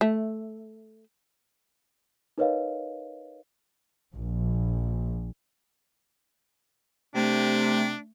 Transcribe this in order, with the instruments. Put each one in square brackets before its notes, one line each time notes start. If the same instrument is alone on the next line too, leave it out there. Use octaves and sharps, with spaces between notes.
[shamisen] A3
[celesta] D#4 A#4 B4 C#5 D#5 F5
[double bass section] A#1
[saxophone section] C3 [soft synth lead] A3 [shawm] D4